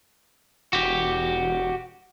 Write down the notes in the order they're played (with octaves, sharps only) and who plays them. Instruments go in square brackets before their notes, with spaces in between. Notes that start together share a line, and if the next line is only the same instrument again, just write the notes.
[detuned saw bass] E1 [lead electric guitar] F#4 G4